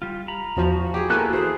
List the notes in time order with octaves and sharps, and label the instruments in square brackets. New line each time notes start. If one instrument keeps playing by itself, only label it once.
[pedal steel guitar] G3 F4
A#5 B5
[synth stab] E2 F3 [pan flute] F#4
[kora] G4 G#4
[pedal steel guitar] A#3 B3 F#6 [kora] E4 [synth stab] A4 A#4 G#5
[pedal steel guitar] E3 [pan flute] G#4 [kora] C5